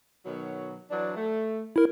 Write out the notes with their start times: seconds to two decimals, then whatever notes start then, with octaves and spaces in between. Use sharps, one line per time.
0.24 B2 D#3 F#3
0.90 E3 F#3 D4
1.15 A3
1.76 E4 A#4